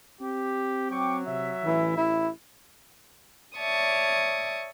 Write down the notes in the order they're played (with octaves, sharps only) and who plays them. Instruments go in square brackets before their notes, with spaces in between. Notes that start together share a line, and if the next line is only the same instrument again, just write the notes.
[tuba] C4 [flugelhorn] G4
[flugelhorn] F#3 [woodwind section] G5 C#6 D6
[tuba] C3 [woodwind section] E5
[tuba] A1 [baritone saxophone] E3
[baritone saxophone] E4
[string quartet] C#5 D5 E5 A5 C#6 D#6